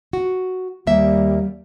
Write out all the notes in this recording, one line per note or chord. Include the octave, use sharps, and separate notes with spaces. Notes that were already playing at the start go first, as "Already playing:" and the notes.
F#4
D#2 G3 A#3 E5